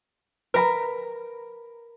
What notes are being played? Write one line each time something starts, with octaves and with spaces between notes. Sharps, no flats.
A#4 B4 E5 A#5 B5